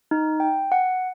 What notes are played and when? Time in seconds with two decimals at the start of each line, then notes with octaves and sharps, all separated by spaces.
0.11 D#4
0.40 G5
0.72 F#5